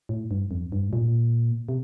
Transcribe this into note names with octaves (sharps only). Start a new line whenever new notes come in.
A2
G2
F2
G2
A2
A#2
C3